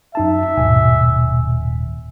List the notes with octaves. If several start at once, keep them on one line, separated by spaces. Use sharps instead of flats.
F#2 D#4 E5 A5
D#1 G#2 B2 G#5